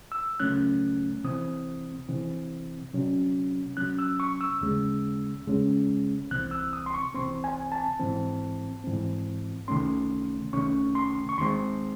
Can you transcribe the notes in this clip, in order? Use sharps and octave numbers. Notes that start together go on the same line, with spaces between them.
E6
C#2 C#3 F#3 A3 C#4 F#6
C3 E3 C4 D#6
C3 E3 C4
C3 F#3 C#4
C3 F#3 C#4 F#6
E6
C#6
E6
D#2 C#3 G#3 C#4
D#2 C#3 G#3 C#4
C2 C3 E3 C4 F#6
E6
D#6
C6
C#6
C2 C3 E3 C4 C6
G#5
A5
G#2 E3 C4
G#2 E3 C4
C2 C3 D#3 A3 C#4 C6
C2 C3 D#3 A3 C#4 C#6
C6
C#6
D#2 D#3 G#3 C4 C6